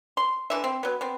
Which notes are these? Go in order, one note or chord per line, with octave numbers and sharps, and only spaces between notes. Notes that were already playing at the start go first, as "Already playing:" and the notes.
C6
D3 E3 E5
C4
F#3 B3
B3 C4